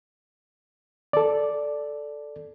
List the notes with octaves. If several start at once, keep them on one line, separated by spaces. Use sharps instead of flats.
A4 D5